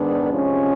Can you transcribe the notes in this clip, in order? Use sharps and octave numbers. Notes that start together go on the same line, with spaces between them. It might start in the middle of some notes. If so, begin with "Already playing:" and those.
Already playing: G#2 D#3 G#3 B3 D4
C3 F3 G#3 C#4